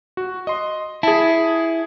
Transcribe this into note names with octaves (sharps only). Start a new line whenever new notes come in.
F#4
D#5 C6
E4 G#4 A5